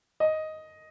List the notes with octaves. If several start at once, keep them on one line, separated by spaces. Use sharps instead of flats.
D#5